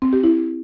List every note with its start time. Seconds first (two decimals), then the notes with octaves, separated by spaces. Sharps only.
0.02 C4
0.13 G4
0.24 E4